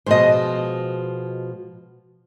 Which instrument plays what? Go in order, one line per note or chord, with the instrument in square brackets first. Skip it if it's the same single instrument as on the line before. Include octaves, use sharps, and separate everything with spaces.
[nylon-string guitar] B2 F3 G#3 [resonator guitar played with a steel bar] C5 D#5